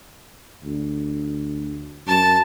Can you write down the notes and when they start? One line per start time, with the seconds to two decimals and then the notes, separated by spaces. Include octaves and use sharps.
0.65 D2
2.07 F#2 A5